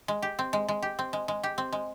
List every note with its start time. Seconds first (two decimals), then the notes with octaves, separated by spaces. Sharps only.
0.08 G#3
0.22 G4
0.39 C4
0.53 G#3
0.68 G#3
0.82 G4
0.99 C4
1.13 G#3
1.28 G#3
1.43 G4
1.58 C4
1.73 G#3